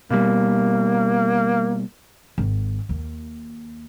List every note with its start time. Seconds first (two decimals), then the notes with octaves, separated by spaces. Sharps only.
0.11 B2 G3 A#3
2.38 G#1
2.89 D#2 A#3